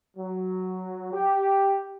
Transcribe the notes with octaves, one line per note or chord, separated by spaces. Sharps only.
F#3
G4